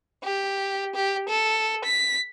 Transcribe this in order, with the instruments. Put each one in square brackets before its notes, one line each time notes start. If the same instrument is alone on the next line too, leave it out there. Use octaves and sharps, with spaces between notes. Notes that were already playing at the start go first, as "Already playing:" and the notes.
[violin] G4
G4
A4
B6